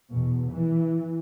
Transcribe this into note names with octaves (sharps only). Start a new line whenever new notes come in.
E2 B2
E3